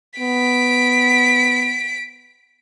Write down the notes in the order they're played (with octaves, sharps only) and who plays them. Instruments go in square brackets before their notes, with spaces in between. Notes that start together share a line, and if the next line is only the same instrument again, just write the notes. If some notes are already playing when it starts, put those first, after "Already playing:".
[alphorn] B3 [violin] B6 D7